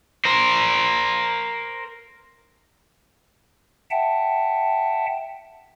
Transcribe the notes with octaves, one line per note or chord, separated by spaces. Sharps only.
A#4 C5
E5 F#5 G5 A5